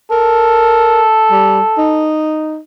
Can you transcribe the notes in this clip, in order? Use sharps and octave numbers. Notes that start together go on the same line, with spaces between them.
A4 A#4
G3
D#4